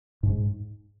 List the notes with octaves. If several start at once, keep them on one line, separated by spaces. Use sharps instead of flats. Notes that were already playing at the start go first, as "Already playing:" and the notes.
G#2